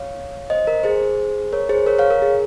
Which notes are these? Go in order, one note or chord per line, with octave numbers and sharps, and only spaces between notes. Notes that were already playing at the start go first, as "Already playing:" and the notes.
Already playing: C#5 F5
C5 D#5
A#4
G#4 C5
A#4 C#5
G#4 C5
A#4 C#5
C#5 F5
A#4
G#4